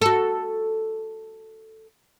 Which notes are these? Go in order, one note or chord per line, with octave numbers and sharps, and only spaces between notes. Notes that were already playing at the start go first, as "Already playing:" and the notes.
F#4 A4